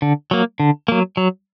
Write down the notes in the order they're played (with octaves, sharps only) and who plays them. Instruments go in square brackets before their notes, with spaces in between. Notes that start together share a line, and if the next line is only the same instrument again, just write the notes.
[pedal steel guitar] D3
F#3 A#3
D3
F#3 A#3
F#3